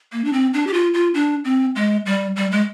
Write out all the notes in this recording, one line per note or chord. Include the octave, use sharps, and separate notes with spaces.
A#3
D4
C4
D4
G4
F4
F4
D4
C4
G#3
G3
G3
G#3